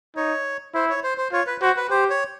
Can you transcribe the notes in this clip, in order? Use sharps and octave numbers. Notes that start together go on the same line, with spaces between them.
D#4 C#5
E4 C5
C#5
C5
C5
F4 C#5
B4
F#4 C5
B4
G4 C5
C#5